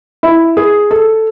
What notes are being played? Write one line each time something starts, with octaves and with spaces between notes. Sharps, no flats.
E4
G#4
A4